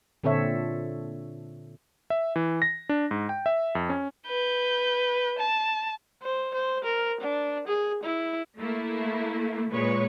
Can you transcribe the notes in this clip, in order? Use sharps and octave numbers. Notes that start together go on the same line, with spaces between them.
A#2 D3 C4 A4 C#5 E5
E5
E3
A#6
D4
G#2
G5
E5
F2
C#4
B4 G6
A5
C5
C5
A#4
D4
G#4
E4
A3 A#3 E4
A#2 G#3 B4 C#5 C#6